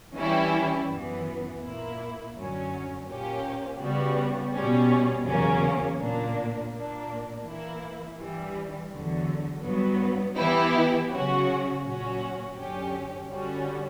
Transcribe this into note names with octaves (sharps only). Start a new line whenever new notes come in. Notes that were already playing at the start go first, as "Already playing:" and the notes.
E3 G3 C#4 E4 G4
F#2 E3 B3
A#2 A#3 E4
F#2 D3 F#3 C#4
A#2 A#3 C#4 G4
C#3 G3 B3 F#4
B2 G3 C#4
E2 C#3 F#3 A#3 C#4
A#2 A#3 D4
A#2 A#3 D4
E3 A#3 E4
G2 E3 G3
E2 D3 F#3
G2 F#3 B3
E3 B3 E4 G4
C#3 F#3 C#4 F#4
A#2 F#3 C#4 F#4
F#2 D3 F#3 C#4 G4
D3 G3 C#4 F#4